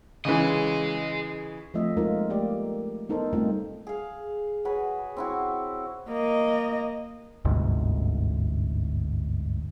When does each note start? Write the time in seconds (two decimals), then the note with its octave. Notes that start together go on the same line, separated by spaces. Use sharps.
0.25 C#3 E3 G#4 D#5
1.74 F3 A3 C4 F4 D#5 E5
1.97 G#3 A#3 D#4 F4 A#4
2.30 A3 A#3 G4 D5
3.09 B3 D#4 A4 A#4 C5
3.33 G3 A3 A#3 C4 D#4 F4
3.87 G#4 F5
4.65 F#4 G#4 B4 C#5
5.16 C4 E4 F#4
6.09 A#3 D#5
7.45 G1 D2 G#2 C3